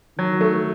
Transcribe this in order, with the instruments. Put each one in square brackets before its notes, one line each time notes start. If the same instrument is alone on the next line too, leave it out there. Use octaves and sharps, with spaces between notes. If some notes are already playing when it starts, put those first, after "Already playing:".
[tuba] D#3 [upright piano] F#3
[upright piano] A3